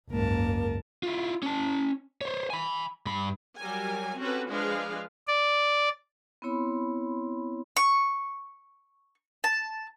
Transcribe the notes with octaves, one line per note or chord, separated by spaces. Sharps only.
F#1 C#2 G#2 A#3 A#4 A5
E4 F4
C#4 A5
C5 C#5
G#5 B5
G2 B5
F#3 G3 G4 A#4 G#5
C4 C#4 F#4 G4 A4 B4
F3 G#3 D4 G#4 B4 F5
D5
B3 C4 E4 C#5 B5 C6
C#6
A5